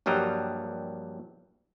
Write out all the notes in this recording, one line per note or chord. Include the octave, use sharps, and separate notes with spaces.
A#1 G2 F#3 G3 D#5 A#5